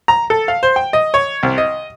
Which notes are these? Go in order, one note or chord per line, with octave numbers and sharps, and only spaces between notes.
A#5
A4
F5
C5
G5
D#5
C#5
C2
D#5